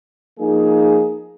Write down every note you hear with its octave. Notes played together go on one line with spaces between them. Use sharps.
F3 A#3 D#4 G#4